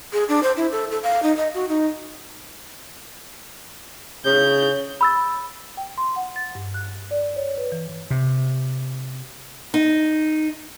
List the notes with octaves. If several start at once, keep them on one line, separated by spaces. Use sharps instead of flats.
G#4
D4
C5
E4
A4
A4
F5
D#4
D#5
F#4
D#4
C#3 G6
B5 E6 A6
G5
C6
F#5
A6
G2
F#6
D5
C#5
B4
E3
C3
D#4